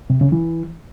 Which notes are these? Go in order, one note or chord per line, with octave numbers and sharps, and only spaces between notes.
C3
C#3
E3